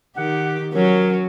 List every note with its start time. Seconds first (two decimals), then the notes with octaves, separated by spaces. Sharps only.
0.17 D#3 G4 F#5
0.72 F#3 C#4 A#4